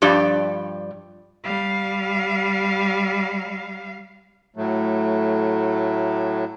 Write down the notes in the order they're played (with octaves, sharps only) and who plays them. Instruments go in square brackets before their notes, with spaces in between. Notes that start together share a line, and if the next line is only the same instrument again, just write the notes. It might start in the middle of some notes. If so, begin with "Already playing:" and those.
[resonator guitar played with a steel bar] G2 F3 G4 D5
[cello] G3 F5
[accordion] A2 F#3 A3